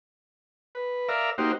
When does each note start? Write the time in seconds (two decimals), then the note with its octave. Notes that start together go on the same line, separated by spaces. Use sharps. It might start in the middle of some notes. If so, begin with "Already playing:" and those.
0.75 B4
1.09 A#4 D5 E5 F5 A#5
1.38 A#3 D#4 F#4 G4 C5